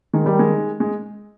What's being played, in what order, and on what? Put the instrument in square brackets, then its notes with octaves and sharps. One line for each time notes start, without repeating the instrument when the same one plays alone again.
[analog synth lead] D#3 [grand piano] G#3
[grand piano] G3
G#3
G#3